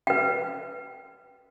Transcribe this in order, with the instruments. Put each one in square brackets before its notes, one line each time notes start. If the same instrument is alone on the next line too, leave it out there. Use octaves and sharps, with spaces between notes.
[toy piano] B4 G5